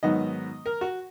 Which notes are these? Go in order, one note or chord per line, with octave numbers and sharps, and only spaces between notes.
G#2 D#3 F#3 B3 D#5
A#4
F#4